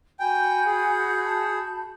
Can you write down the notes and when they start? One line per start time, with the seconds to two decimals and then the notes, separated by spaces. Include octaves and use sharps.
0.20 F#4 G5 G#5 B5 G6
0.66 G#4
1.26 A5